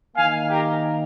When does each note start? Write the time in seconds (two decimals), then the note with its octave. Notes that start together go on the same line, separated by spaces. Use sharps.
0.16 D#3 A#3 D#4 F5 G#5
0.50 G4 A#4